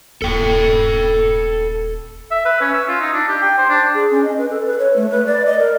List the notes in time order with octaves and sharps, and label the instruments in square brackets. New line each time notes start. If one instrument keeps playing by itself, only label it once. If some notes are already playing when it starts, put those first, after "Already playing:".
[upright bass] D#1 E4 [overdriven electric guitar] A4 G5
[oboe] E5
B4
C#4
E6
F4
D#4
D4
G4
G5
C5
D4
[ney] G#4
C#4
D#5
B4
A4
B4
C#5
A3
B4
D5
D#5
A#4